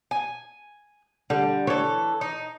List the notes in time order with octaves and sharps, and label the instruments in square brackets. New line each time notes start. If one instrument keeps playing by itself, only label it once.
[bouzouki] G#5
[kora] D3 [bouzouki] G3
[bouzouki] E3 A4 [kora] C#5
[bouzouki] D#4